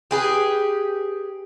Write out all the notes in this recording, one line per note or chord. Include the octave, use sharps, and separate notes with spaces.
G4 G#4 B4